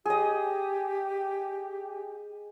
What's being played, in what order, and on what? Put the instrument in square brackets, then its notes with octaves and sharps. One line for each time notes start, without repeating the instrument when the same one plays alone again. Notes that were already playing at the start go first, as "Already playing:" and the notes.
[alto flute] G4 [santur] G#4 D#5